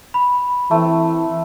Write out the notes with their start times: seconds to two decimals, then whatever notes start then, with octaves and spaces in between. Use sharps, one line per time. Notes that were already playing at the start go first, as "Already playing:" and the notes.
0.14 B5
0.71 E3 A3 C4